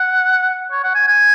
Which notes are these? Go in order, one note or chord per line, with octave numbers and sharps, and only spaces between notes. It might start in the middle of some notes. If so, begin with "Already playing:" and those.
Already playing: F#5
C#5
F#5
G#5
G#5